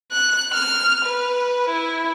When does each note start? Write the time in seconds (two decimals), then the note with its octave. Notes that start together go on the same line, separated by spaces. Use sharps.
0.12 F#6
0.53 F6
1.05 B4
1.69 E4